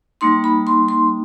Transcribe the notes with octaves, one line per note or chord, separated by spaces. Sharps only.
G3 A#3 D#4 C6
B5
C6
C6